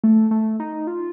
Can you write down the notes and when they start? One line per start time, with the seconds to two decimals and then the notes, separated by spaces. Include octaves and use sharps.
0.04 A3
0.31 A3
0.60 D#4
0.87 F4